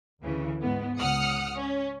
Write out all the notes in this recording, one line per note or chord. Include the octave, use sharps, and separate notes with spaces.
D2 C#3 E3
G#2 B3
C#2 F#5 D#6 F6 C#7
C#4